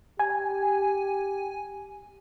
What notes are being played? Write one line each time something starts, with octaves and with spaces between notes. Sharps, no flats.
G4 G#5